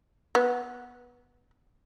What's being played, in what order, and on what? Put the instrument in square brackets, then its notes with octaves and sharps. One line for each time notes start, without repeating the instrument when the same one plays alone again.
[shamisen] B3